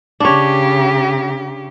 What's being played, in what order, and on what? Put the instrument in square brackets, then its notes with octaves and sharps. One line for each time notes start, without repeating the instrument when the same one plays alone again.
[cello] C#3 G4 [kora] D4 C#5